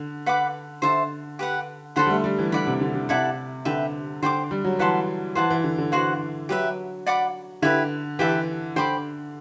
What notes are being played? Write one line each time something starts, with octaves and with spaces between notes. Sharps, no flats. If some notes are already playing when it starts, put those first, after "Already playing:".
Already playing: D3
B4 F#5 B5 D6
D3 C5 E5 A5
G4 B4 F#5
D3 A4 C5 F#5 B5
G3
A3
G3
E3
D3 D5 F#5 B5
C3
D3
D3
C3 E4 A4 D5 F#5
D3 B4 E5 G5
D3 C5 G5 B5 D6
G3
F#3
E3 B4 F#5 A5 C6
E3 C5 F#5 A5
E3
D3
D3
E3 F#4 C5 F#5
F#3 G4 B4 E5
D5 F#5 B5 D6
D3 E4 G4 B4
E3 G4 B4 E5 A5
D3 C5 G5 B5 D6